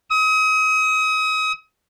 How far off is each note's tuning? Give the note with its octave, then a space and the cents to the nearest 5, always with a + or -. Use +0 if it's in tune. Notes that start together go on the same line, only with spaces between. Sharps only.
D#6 +35